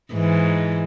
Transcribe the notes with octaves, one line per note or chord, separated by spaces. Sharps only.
G#2 E3